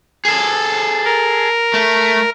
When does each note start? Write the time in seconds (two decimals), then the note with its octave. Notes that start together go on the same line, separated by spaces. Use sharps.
0.25 G#4 A4
1.04 A#4
1.74 A3